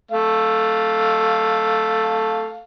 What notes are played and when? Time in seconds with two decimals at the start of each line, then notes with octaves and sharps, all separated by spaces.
0.11 A3 F5